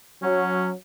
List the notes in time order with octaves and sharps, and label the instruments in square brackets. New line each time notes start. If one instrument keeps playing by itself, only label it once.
[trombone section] F#3 [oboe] C#4